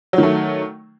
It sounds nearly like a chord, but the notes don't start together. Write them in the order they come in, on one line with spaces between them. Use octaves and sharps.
F#3 D#3 A3